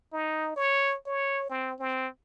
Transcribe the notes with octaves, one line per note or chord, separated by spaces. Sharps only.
D#4
C#5
C#5
C4
C4